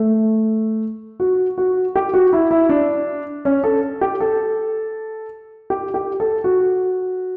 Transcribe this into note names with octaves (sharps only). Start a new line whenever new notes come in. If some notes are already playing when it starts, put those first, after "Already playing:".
Already playing: A3
F#4
F#4
G4
F#4
E4
E4
D4
C#4
A4
G4
A4
G4
G4
A4
F#4